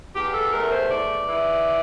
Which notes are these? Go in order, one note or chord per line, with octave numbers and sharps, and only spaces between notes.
E2 G4
A4
A3 A#4
C5
E2 D5
E3